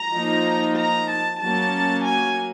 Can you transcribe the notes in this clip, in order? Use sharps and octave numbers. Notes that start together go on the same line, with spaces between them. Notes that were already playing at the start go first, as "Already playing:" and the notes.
Already playing: A#5
F3 A#3 D#4
A#5
A5
F#3 A#3 C#4 A5
G#5